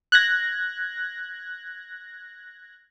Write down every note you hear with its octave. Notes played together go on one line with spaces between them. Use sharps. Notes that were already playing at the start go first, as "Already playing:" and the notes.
F#6 G#6 A#6